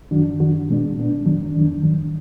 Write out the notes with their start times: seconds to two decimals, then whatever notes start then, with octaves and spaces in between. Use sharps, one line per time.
0.11 F#2 D#3 F#3 D4 F#4
0.40 F#2 D#3 F#3 D4 F#4
0.69 A#2 G#3 B3 D4
0.97 A#2 G#3 B3 D4
1.26 F2 D#3 F#3 D4
1.54 F2 D#3 F#3 D4
1.83 G#2 D#3 F#3